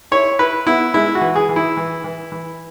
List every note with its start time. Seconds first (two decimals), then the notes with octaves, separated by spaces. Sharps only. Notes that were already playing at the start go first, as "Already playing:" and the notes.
0.12 E4 C#5
0.39 E4 B4
0.67 B3 E4
0.94 G#3 E4
1.15 F#4
1.21 E3
1.36 G#4
1.49 E3
1.56 E4
1.77 E3
2.04 E3
2.32 E3